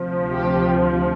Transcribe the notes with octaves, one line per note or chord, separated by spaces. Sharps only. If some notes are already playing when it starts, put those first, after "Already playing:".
Already playing: D2 C3 F3
G4